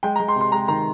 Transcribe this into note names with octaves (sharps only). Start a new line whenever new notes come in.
G#3 G5
A#5
G#3
C6
C3
C6
G#3 A#5
D#3 A#5